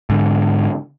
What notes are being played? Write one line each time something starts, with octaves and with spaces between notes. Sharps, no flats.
G#2 D3